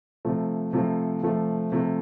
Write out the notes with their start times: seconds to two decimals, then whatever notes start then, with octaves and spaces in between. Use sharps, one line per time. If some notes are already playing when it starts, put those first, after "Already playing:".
0.25 C3 F3 A3
0.73 C3 F3 A3
1.22 C3 F3 A3
1.72 C3 F3 A3